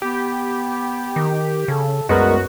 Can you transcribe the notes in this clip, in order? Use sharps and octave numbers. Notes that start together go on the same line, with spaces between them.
B3 G4
D#3
C#3 A4
C2 F#2 G#3 B3 F#4 A#4